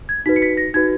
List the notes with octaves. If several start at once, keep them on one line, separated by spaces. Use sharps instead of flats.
G#6
D#4 F#4 B4 B6
C#7
B6
A#6
D#4 F#4 B4 G#6